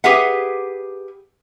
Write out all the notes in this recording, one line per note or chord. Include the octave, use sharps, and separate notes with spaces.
G4 G#4 B4 E5 F#5